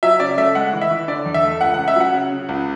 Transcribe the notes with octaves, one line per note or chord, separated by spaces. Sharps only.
F#3 E5
C#3 D5
A3 E5
G#3 F#5
E3
E5
E3
D3 D5
E2
E5
A3
C#2 F#5
C#3 F#5
E5
F#3 F#5
C#3
C#3
C#2